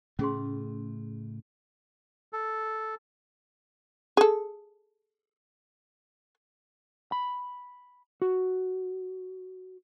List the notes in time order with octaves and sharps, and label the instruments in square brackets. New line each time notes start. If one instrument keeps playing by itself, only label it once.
[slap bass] A2 C#3 A3 [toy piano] C#4 G#4 C6
[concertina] A4
[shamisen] G#4 A4
[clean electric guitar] B5
F#4